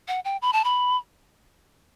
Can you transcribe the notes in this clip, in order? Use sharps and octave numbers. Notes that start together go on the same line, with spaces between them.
F#5
G5
B5
A5
B5